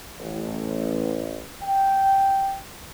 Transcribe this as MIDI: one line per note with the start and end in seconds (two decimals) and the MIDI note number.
0.20 1.43 33
1.63 2.59 79